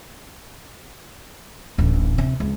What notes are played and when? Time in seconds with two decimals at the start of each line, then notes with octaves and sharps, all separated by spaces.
1.78 D1 A1
2.18 C3
2.40 C#2